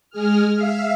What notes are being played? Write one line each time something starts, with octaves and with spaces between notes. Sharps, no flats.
G#3 G#4 F6
E5 F5